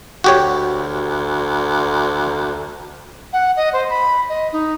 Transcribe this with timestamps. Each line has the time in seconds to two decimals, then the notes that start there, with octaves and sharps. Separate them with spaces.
0.24 D2 F#4 G4 C#5
3.33 F#5
3.56 D#5
3.73 C5
3.90 B5
4.29 D#5
4.52 D#4